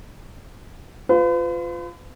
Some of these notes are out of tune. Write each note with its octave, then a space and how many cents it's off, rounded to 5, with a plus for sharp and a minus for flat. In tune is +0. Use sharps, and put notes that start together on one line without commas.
F4 +0 B4 +40